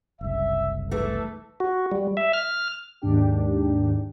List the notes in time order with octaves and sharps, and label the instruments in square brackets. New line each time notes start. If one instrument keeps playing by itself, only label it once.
[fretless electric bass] F#1 C2 [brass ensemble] E5
[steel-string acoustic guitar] E3 A3 [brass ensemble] A4
[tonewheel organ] F#4
G3
E5
F6
[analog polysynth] D#2 G#2 D4 G4